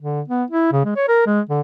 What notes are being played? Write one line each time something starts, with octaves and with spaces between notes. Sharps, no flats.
D3
B3
E4
C#3
G#3
C#5
A#4
G#3
D3